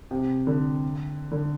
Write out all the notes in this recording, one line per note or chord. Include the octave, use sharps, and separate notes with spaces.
C3
D3
D3